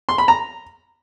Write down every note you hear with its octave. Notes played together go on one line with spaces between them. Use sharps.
C6
B5
A#5